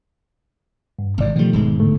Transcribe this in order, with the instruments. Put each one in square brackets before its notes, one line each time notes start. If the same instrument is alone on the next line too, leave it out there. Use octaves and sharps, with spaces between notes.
[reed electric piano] G2
[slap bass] G#1 G#2 [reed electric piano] C3 D5
[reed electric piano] B2 D#3 A3 [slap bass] F3 G3
[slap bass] E1 G#2 G#3
[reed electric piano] A2 D3 A3